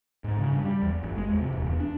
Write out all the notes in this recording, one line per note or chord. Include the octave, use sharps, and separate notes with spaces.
G#2
C#3
G2
G3
E2
G1
G#3
E2
C3
D#1
E2
D4